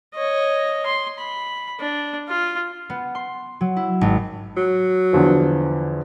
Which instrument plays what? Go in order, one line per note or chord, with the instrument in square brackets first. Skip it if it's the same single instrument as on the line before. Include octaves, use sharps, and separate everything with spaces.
[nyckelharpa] C#5 D#5
C6
B5
D4
F4
[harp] B3
C6
F#3
E4
G#1
[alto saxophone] F#3
[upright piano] E2 D3 F3